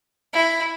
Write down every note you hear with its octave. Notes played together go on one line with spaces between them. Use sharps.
E4